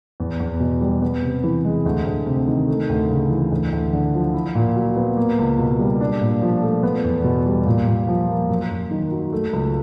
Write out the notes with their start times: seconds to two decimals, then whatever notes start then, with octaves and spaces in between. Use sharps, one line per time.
0.20 E2
0.40 E2
0.60 B2
0.81 G3
1.02 B3
1.22 C3
1.44 E3
1.65 G#3
1.85 D2
2.07 D2
2.27 C3
2.48 D#3
2.68 A3
2.89 D2
3.10 C#3
3.30 E3
3.52 D2
3.72 D2
3.93 D3
4.14 F3
4.34 E4
4.55 A#2
4.76 F#3
4.96 B3
5.17 A#3
5.38 C#2
5.59 B2
5.79 G3
6.01 D4
6.21 A#2
6.41 F3
6.62 A3
6.83 B3
7.04 E2
7.24 B2
7.46 G3
7.66 A#2
7.87 A#2
8.08 F3
8.29 A#3
8.49 F#2
8.71 F#2
8.91 D#3
9.11 F#3
9.32 A3
9.53 C#2